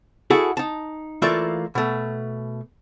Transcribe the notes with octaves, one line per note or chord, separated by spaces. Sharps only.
E4 F#4 G#4 A4 F#5
D#4 A5
E3 A3 A#3 F4 D5 E5
B2 A3